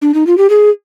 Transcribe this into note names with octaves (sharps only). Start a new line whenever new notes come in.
D4
D#4
F4
G4
G#4